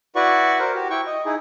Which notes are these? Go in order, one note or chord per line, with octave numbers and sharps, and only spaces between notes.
E4 F#4 B4 D5 F#5 C#6
A#4 C5
F#4 G4
E4 G5 C#6
D#5
D#4 E4 G#4